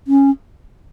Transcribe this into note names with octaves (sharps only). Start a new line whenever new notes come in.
C#4